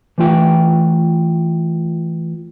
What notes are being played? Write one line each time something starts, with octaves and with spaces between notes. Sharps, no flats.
E3 A3 F4 G5